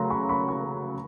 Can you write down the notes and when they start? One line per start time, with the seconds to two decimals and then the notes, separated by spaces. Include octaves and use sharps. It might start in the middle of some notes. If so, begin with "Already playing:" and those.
Already playing: C#3 F#3 A3 A#5 C6
0.10 B5 C#6
0.29 B5 C#6
0.48 B5 C#6